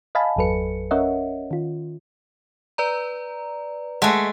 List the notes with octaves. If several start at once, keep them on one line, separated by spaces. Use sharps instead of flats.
D#5 F5 G#5 A5 B5
G1 E2 F#3 A4 B4 C#7
C#4 A#4 C#5 D#5 E5 F#5
D#3 F4
B4 D5 A#5
G#3 A3 F#5 A5 F#6